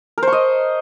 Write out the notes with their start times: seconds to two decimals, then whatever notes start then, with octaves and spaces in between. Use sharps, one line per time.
0.18 A#4
0.23 C5
0.28 C#6
0.33 D#5